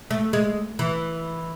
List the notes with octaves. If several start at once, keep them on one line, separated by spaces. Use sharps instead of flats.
A3
G#3
E3